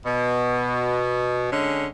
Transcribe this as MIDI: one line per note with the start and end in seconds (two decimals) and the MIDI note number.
0.04 1.46 47
1.51 1.85 50
1.51 1.85 56
1.51 1.85 61